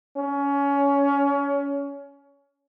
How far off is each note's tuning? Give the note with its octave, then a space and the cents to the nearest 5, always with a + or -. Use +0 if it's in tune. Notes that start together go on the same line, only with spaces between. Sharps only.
C#4 +25